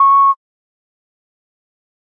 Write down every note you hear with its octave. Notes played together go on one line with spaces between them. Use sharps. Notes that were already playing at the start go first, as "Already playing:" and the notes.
Already playing: C#6